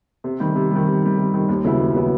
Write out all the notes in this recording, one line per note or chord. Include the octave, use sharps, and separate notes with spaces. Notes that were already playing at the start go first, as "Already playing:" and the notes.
C3
D#3 G3
C3
D#3 G3
C3
D#3 G3
C3
D#3 G3
D#2
C#3 F#3 B3 E4
D#2
C#3 F#3 B3 E4